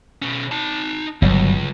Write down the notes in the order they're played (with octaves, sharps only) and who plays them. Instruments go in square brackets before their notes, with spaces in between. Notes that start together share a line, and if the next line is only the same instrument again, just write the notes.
[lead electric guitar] B2 C#4
D#4 A5
[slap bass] G1 F#3 [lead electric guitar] C#2